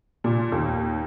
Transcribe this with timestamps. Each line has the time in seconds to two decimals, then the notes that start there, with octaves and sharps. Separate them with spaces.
0.24 A#2
0.52 D#2